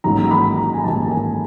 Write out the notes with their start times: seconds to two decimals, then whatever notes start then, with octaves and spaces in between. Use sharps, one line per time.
0.04 A1 G#2 D#3 F#3 A#3 A#5
0.24 A#5
0.31 B5
0.57 A#5
0.74 G#5
0.84 A1 G#2 D#3 F#3 A#3 A5
1.11 G#5